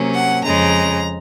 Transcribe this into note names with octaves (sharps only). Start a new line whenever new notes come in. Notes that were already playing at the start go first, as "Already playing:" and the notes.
Already playing: C3 F#3 A#3 C#4
F#5
F2 C#3 G#3 A#5